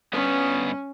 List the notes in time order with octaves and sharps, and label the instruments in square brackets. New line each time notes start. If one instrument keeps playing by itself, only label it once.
[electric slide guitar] G2 B3 B4 [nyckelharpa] C#4